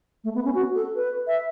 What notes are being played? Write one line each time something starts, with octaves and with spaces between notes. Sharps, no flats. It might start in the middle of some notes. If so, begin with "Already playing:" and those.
A3
B3
C#4
F#4
A4
B4
E5